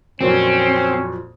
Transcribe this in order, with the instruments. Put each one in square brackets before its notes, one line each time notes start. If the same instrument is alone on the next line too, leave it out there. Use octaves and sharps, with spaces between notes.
[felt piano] F2 A#2 F#3 [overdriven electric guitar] C4 [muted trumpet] C#4